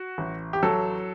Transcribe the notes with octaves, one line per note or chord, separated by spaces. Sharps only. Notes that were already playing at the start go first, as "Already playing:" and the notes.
Already playing: F#4
A1
G4
F#3 A4